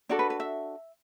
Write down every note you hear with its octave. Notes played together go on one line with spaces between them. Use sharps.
D4 F#4 A4 D5
B4
B4
E5